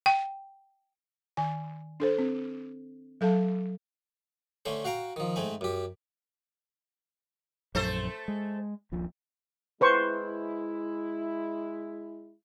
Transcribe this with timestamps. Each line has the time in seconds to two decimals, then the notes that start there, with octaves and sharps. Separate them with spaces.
0.06 G5
1.37 D#3 G#5
2.00 D4 A4 C5
2.18 C4
3.21 F#3 A4 F5 A5
4.65 D3 A3 C#4 C5
4.84 F#4 F5 G5 A#5
5.16 D#3 F3
5.36 G#2 A3 C4 G#5
5.61 F#2 G4
7.75 A#1 F#2 A3 A4 C5
8.28 G#3
8.92 D#1 A#1 F3
9.81 G#3 E4 B4 C5 C#6